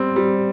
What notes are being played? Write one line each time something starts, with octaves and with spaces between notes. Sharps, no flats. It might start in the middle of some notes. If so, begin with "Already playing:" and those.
Already playing: G3 C4
G3